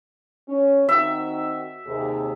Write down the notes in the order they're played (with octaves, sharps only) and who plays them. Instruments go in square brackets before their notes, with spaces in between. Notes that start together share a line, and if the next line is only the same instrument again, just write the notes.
[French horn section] C#4
[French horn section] D#3 C4 F#4 [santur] E5
[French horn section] D#2 C3 G#4